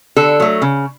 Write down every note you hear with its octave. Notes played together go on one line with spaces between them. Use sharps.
D3 A4
F#3 A3
C#3